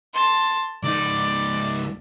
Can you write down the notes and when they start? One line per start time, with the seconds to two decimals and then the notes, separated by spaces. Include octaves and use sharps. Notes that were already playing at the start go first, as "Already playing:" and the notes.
0.14 A5 C6
0.83 C#2 D#4 D5